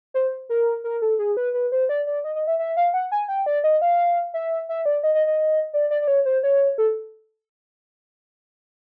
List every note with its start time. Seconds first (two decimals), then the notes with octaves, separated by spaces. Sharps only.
0.14 C5
0.49 A#4
0.84 A#4
1.02 A4
1.19 G#4
1.37 B4
1.54 B4
1.72 C5
1.89 D5
2.07 D5
2.24 D#5
2.35 D#5
2.47 E5
2.59 E5
2.77 F5
2.94 F#5
3.12 G#5
3.28 G5
3.46 D5
3.64 D#5
3.82 F5
4.34 E5
4.69 E5
4.85 D5
5.03 D#5
5.15 D#5
5.27 D#5
5.73 D5
5.91 D5
6.02 D5
6.08 C#5
6.25 C5
6.43 C#5
6.78 A4